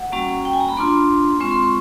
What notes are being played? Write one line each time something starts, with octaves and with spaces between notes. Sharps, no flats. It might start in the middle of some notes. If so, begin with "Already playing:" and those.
Already playing: F#5
G3 A#3 C#4 F#4
G5
G#5
A#5
B5
A#3 D4 F4 C6
G#3 C4 F4 C#6
C6
C#6